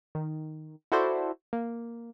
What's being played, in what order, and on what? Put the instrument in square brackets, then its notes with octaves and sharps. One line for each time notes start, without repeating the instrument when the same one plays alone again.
[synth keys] D#3
E4 F#4 A4 C5 D5
A#3